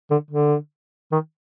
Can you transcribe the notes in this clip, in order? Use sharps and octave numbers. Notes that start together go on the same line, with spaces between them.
D3
D3
D#3